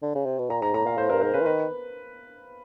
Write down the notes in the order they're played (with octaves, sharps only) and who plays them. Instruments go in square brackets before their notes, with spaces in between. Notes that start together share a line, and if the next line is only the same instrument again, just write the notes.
[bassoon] D3
C#3
C3
B2
[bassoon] A#2 [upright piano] A#5
[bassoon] G#2 [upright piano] A#5
[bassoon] A2 [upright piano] A#5
[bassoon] A#2 [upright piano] F5
[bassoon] A2 [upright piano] C5
[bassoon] G2 [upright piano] A#4
[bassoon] G#2 [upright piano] A#4
[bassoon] C#3 [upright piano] B4
[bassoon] E3
[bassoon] D#3 [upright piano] B4